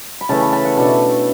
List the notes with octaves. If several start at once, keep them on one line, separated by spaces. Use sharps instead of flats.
B5
C#3 E3 A3 E4 A5
B5
A5
F#5
B2 A3 D4